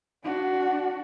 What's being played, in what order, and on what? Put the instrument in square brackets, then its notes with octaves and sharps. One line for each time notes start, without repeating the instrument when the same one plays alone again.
[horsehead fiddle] D4 F#4